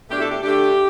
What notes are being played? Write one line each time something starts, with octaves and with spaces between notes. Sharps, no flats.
B2 A3 D4 G4
E4 A4
G4
D3 A3 D4 G4